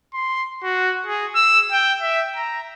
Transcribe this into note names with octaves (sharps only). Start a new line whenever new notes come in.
C6
F#4
G#4
E6
G5
E5
A#5